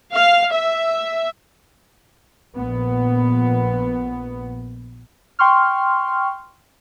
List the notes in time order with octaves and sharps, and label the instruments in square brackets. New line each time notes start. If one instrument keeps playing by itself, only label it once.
[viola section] F5
E5
[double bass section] A#1 B3
[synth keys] G5 C6 C#6 F6